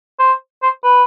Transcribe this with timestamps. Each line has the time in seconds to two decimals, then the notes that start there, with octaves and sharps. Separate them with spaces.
0.19 C5
0.63 C5
0.84 B4